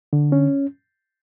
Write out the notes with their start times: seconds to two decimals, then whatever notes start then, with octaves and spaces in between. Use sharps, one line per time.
0.13 D3
0.32 C#4